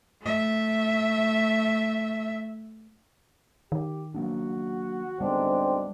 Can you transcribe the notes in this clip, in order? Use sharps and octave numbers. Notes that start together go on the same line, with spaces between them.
A3 E5
D#3 G4
F#3 A#3 D4 F#4
D2 G#2 G3 B3 C4 D4